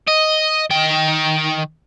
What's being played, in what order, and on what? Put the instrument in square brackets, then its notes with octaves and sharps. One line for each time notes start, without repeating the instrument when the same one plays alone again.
[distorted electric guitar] D#5
D#3 G5